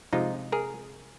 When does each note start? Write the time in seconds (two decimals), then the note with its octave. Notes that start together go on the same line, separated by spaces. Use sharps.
0.13 C3 F3 G#3 D#4 F4
0.52 G#4 A#4